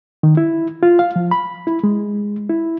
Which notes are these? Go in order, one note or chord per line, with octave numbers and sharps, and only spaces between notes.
D#3
E4
F4
F5
F3
B5
E4
G#3
E4